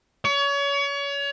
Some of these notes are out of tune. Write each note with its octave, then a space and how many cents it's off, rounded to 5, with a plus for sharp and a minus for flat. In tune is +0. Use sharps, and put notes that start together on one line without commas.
C#5 +30